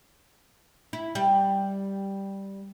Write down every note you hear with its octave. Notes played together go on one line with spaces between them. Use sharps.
E4
G3